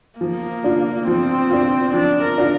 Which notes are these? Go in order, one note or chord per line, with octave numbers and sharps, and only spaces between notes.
F3 A#3
D4 F4
F3 C4
D4 F4
F3 D4
A#4
D4 F4